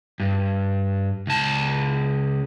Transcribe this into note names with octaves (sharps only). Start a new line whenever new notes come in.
G2
C#2 A5